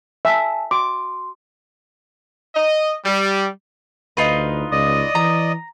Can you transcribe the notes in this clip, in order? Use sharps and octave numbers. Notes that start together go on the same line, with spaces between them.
E5 G#5 A5
F#4 C6 D6
D#5
G3
D2 D#4 F4 B4
C#2 D5 D#5 D#6
E3 A#5